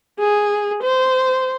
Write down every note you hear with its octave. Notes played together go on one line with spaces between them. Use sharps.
G#4
C5